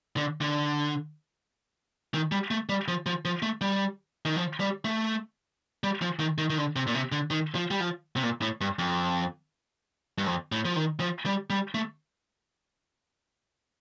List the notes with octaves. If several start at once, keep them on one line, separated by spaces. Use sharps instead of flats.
D3
D3
D#3
G3
A3
G3
F3
F3
F3
A3
G3
D#3
F3
G3
A3
G3
F3
D#3
D#3
D#3
D3
C3
A#2
C3
D3
D#3
F3
G3
F3
C3
A#2
A2
G2
F2
G2
F2
A2
F3
D#3
F3
G3
G3
A3